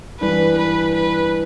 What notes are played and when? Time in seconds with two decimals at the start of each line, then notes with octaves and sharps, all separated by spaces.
0.21 G2 E3 G3 D4 B4
0.58 B4
0.95 B4